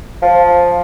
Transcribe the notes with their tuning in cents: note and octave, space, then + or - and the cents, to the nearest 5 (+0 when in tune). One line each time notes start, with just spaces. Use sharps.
F3 +5